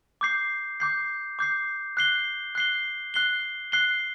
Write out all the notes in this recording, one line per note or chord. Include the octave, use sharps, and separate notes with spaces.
D6 G6 C7
D6 G6 C7
D6 G6 C7
F#6 C7 G7
F#6 C7 G7
F#6 C7 G7
F#6 C7 G7